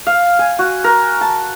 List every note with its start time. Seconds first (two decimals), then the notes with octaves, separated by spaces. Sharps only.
0.07 F5
0.39 G#5
0.59 F#4
0.84 A#4
1.21 A5